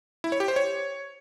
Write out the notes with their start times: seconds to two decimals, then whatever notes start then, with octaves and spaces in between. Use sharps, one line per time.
0.24 E4
0.32 C#5
0.40 G4
0.48 C5
0.56 C#5